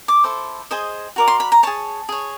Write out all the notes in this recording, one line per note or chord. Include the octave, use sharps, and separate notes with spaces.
D6
E4 A4 C5
G#4 C5 D#5
F#4 A#4 D5
C6
B5
A#5
G#4 C#5 A5
G#4 C#5